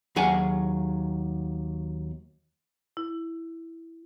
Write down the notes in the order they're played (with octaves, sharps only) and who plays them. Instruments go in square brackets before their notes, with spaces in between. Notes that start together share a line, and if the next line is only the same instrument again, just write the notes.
[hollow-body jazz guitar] D#2 F#3 G#4 F#5 G#5
[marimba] E4